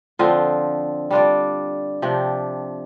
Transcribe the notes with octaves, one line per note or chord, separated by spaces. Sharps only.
D3 F3 C4 F4
G3 D4 F4 D5
C3 F3 D4 G4